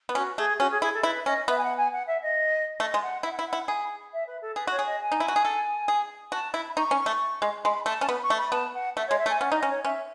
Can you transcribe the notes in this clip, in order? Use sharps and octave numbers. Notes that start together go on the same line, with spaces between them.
B3
C#4 F#4
A3 G#4
C#4 F#4
G#4
E4 G#4
A4
E4 B4
C#4 D#5
B3 E5
G#5
F#5
G#5
F#5
E5
D#5
A3 D#5
G#3
F#5
E4 E5
F#5
E4 E5
F#5
E4
G#4 B5
E5
B4
A4
G#4 B4
F#4 C#5
G#4
D#5
G#5
D#4
E4
F#4
G#4
A4
G#4
F#4 A5
E4 B5
D#4 C#6
C#4
A3
G#3
G#3 B5
A3 A5
C#4 A5
B3 B5
C#6
A3
B5
B3 A5
F#5
A3 E5
C#5
G#3
E5
A3
G#5
C#4 F#5
D#4 D#5
C#4
C#5
C#4 E5